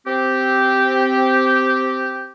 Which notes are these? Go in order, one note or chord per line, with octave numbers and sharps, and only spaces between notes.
C4 G4